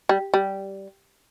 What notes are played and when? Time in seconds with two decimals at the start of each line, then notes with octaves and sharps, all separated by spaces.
0.09 G3
0.34 G3